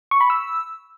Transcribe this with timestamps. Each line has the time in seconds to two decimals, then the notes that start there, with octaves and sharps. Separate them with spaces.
0.11 C#6
0.21 B5
0.30 E6